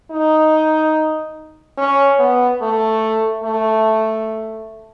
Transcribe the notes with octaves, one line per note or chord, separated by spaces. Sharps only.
D#4
C#4
B3
A3
A3